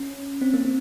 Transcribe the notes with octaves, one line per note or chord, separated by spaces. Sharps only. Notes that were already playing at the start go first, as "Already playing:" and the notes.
Already playing: C#4
C4
A#3
C4